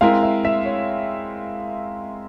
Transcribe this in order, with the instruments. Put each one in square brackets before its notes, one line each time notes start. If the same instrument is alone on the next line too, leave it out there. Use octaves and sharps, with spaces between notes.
[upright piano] G#3 C4 E4 A#4 [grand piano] F5
[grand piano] E5
E5
C#5